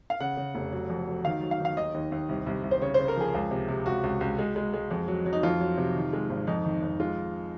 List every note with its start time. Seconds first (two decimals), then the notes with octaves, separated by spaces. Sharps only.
0.10 F5
0.20 C#3 F#5
0.37 C#3
0.55 F1
0.72 F#3
0.89 F2
1.07 F#3
1.24 D#3 F5
1.42 F#3
1.51 F5
1.60 D#3
1.65 F5
1.77 D#2 D#5
1.94 D#2
2.12 D#2
2.29 C2
2.46 C2
2.64 C2
2.71 C5
2.82 C#3 C#5
2.94 C#3 C5
3.08 A#4
3.16 F3 G#4
3.34 C#2
3.51 C3
3.68 C3
3.86 C#2 F#4
4.03 C#2
4.21 C#2
4.39 G#3
4.56 G#3
4.74 G#3
4.90 F2
5.08 F#3
5.26 F#3
5.33 D#4
5.43 F2 F4
5.60 F#3
5.78 C3
5.95 D#3
6.13 G#3
6.30 G#1
6.47 F2 D#4
6.65 D#3
6.82 F2
7.00 G#3 F4